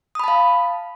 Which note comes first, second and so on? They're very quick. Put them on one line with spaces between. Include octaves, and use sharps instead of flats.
D#6 B5 A5 F5